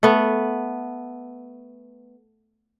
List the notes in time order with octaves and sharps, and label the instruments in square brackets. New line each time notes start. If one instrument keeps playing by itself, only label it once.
[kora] A3 B3